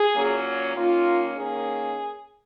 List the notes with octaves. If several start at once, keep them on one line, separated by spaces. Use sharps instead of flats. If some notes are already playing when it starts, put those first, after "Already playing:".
Already playing: G#4
A#2 F#3 A#3 C#4
D#3 A#3 C#4 F4
D#3 A#3 C#4 G#4